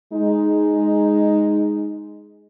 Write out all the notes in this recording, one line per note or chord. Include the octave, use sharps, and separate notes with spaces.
G#3 D#4